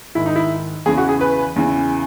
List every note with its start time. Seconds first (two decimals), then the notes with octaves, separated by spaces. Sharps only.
0.15 G#2 D#3 E4
0.26 D#4
0.36 E4
0.86 E2 C#3 E3 G#4
0.98 F#4
1.09 G#4
1.21 B4
1.56 E2 C#3 E3